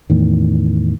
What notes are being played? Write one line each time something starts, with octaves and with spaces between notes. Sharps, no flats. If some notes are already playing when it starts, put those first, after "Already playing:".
E2 A2 D#3